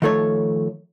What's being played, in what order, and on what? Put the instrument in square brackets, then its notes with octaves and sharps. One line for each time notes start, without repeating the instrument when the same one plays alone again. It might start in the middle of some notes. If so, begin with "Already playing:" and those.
[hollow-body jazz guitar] D#3 F3 A3 A4 B4 C#5